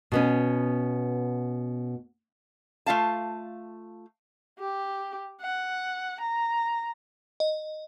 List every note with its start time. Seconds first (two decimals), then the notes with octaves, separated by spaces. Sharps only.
0.12 B2 B3 C#4
2.86 A3 F4 F5 A5
4.59 G4
5.41 F#5
6.21 A#5
7.40 D#5